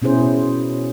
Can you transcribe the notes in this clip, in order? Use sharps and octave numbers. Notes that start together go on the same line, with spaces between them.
B2 C#4 E4 G#4 C5